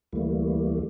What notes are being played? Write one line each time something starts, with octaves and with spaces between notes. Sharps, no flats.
D2 E3 G3 A3 A#3